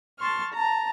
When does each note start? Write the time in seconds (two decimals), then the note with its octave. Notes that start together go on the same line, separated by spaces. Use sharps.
0.18 A5 C6 C#6 F6
0.53 A5 A#5